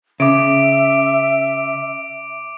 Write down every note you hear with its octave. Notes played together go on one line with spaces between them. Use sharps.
C#3 E5 D6 D7